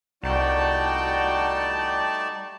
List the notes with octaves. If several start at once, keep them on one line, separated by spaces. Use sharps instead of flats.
C2 G3 A3 D#4 F#4 D5 G5 A5